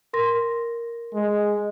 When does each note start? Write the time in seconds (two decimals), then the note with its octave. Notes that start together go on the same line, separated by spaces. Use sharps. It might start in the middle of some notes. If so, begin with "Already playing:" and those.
0.13 A#4 C6 A#6
1.14 G#3